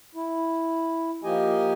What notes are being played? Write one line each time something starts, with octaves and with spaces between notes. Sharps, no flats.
E4
F3 A#3 G4 D#5 G#5